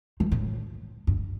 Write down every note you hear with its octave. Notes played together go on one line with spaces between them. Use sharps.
D#3
A2
G2